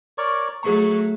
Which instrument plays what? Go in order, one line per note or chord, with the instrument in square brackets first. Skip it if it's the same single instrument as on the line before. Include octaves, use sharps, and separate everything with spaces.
[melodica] A#4 C#5 D5 [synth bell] C#6
[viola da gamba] F#3 A3 [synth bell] G#4 A#5 [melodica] C#6